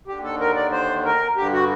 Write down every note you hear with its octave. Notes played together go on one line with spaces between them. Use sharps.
D#2 D3 G4
A4
A#4
D5
C5
A#4
G2 D3 G4
F#4